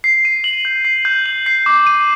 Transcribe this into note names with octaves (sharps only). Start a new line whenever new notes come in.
C7
D#7
F#7
G6
C7
G6
F#7
C7
D6
D#7